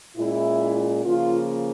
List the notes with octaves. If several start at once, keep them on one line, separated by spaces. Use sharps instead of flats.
A#2 G#3 C#4 E4
C#3 F3 A#3 F4